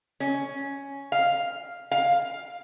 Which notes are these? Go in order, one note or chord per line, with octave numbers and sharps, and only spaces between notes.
C#4
F5
F5